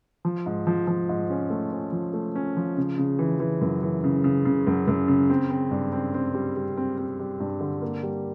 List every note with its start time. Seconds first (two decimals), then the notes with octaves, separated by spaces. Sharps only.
0.25 F3
0.46 G#2
0.67 F3
0.87 F3
1.09 G#2
1.30 C#4
1.50 A3
1.72 C#4
1.92 F3
2.14 A3
2.35 C#4
2.57 F3
2.77 C#3
2.98 C#3
3.19 E3
3.40 E3
3.61 F#2
3.83 E3
4.04 C#3
4.24 C#3
4.45 C#3
4.67 F#2
4.88 F#2
5.08 C#3
5.30 C4
5.51 C4
5.71 G2
5.92 C4
6.14 C4
6.35 G3
6.56 G3
6.77 C4
6.98 C4
7.19 G3
7.40 G2
7.61 D3
7.82 A#3
8.03 G3